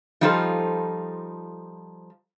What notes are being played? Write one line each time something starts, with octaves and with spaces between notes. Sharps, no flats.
F3 G3 D#4 F4 A4 C5